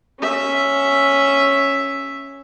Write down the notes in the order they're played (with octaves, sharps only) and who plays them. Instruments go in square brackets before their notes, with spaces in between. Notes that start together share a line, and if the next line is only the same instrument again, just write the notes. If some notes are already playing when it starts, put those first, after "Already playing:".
[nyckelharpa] C#4 E5